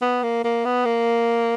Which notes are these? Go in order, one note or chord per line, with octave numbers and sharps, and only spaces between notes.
B3
A#3
A#3
B3
A#3